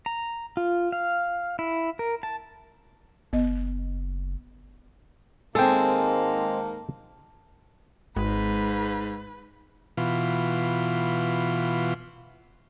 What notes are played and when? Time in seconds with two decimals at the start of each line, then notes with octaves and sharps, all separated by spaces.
0.06 A#5
0.57 F4
0.92 F5
1.59 E4
1.99 A#4
2.23 A5
3.33 F#1 B3 D#5
5.55 G#2 D#3 G#3 A#3 C4 A4 G5 A5
8.16 G#1 G#2 G#3 B4
9.97 B2 E3 F4